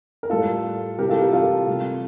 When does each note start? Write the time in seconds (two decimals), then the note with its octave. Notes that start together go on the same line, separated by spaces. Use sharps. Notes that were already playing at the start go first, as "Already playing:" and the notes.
0.23 A#4
0.30 A2 G3 F4 A4
0.98 C3 E3 G3 G4 A#4
1.10 F4 A4
1.21 G4 A#4
1.32 F4 A4
1.67 C3 G3